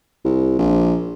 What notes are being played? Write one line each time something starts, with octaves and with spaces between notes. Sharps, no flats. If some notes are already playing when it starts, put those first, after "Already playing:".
C2
A#1